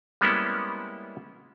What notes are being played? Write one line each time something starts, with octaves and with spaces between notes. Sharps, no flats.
G3 G#3 A#3 B3 C#4 E4